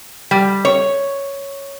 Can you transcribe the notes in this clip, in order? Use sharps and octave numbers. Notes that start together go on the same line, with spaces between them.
G3
C#5